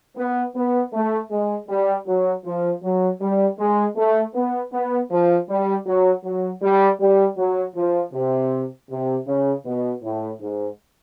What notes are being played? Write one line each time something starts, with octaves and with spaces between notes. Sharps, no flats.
B3
B3
A3
G#3
G3
F#3
F3
F#3
G3
G#3
A3
B3
B3
F3
G3
F#3
F#3
G3
G3
F#3
F3
C3
C3
C#3
B2
A2
G#2